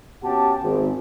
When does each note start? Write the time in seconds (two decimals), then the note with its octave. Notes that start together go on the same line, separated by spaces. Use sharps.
0.23 B2 C#4 G4 F#5 A5
0.62 G#1